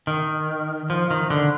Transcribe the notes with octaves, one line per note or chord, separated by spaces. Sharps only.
D#3
F3
D#3
D3